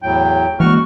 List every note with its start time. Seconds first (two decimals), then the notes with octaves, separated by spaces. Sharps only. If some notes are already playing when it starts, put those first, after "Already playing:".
0.03 E2 A2 F#3 G5
0.60 E3 G#3 A#3 F#4 C#6 F6